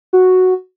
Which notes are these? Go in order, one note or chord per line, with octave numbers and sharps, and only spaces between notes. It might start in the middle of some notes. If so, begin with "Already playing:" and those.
F#4